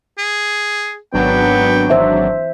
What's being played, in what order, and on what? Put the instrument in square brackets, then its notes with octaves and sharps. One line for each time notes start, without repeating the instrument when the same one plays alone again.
[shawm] G#4
[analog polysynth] G#1 F#3 D4 [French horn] B3 [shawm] G5
[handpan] E3 C5 E5